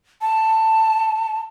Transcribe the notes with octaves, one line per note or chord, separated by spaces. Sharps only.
A5